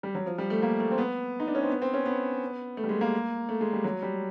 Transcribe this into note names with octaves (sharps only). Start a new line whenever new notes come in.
G3
F#3
F3
G3
A3
A#3
A3
C4
B3
D#4
D4
C#4
C4
B3
C4
C#4
B3
A3
G3
G#3
A#3
A3
G#3
G3
F#3
G3